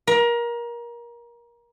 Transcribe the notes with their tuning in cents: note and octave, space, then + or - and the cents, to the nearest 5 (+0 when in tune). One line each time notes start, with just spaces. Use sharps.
A#4 +25